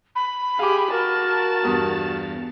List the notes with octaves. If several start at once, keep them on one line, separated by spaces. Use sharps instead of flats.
B5
G4 G#4 F5 D6
F#4 A#4 A5
E2 G2 D#6